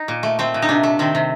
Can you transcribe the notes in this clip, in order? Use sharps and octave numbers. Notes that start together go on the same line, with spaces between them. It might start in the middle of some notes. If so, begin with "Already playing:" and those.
Already playing: D#4
A#2
A3
A3 C4
A#2
D#4
C3 D4
A3
D#3 C4
C3